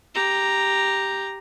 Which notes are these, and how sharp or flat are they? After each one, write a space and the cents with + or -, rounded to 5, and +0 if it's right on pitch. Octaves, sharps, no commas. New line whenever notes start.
G4 +0 A#5 +0